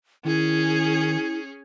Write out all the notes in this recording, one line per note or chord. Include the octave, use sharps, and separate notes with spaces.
D#3 C#4 E4 G#4